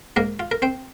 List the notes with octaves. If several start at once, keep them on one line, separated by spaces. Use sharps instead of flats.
G#2 A#3 A#4
F4
A#4
C4 C5